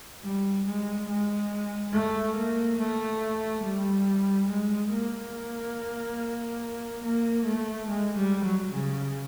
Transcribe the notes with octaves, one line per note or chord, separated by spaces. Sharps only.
G3
G#3
G#3
A3
A#3
A3
G3
G#3
A#3
A#3
A3
G#3
G3
F#3
C#3